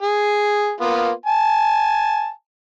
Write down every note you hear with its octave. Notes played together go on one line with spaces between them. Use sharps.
G#4
A#3 B3 F4
G#5 A5